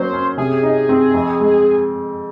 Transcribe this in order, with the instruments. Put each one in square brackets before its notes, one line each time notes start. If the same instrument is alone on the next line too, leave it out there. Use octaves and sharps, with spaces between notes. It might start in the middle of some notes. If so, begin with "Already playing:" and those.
Already playing: [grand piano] F#3 A#3 C#4 [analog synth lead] C5
[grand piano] C#4
[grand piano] C3 [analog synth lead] G#4
[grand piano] D#4
C4
F2
G#3